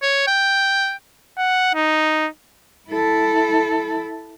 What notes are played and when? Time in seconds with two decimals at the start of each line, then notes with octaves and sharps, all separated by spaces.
0.02 C#5
0.27 G5
1.37 F#5
1.74 D#4
2.90 E4 A4